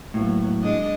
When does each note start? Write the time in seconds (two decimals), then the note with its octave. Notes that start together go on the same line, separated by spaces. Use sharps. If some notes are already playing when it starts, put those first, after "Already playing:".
0.14 A2 F#3 A#3 B3
0.63 G#3 D4 D#5